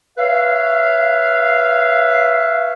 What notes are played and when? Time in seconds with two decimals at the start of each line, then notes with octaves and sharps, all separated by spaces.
0.18 B4 C#5 E5 F5